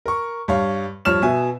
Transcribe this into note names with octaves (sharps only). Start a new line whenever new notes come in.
A#4 C#6
G2 C#5 F5
G2 F3 C#5 F6 E7
B2 B3 E5 G#5